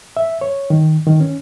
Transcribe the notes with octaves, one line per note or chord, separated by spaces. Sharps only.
E5
C#5
D#3
D#3
C#4